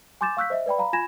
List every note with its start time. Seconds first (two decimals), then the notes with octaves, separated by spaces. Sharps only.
0.21 G#5 C6 D6 G6 A6 E7
0.37 F5 C#6 E6 F#6 G6 B6
0.50 C5 D#5 E5
0.66 B4 D5 G5 B5
0.78 F5 A#5 B5
0.93 F4 G#5 B5 G#6 A#6 E7